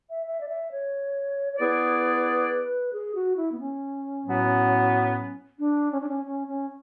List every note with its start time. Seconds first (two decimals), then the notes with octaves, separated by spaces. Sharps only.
0.10 E5
0.27 E5
0.41 D5
0.49 E5
0.72 C#5
1.53 C#5
1.59 B3 E4 G#4 B4 D5
2.93 G#4
3.15 F#4
3.37 E4
3.52 B3
3.60 C#4
4.26 A2 F#3 B3 F#4
5.59 D4
5.92 C#4
6.00 D4
6.09 C#4
6.26 C#4
6.47 C#4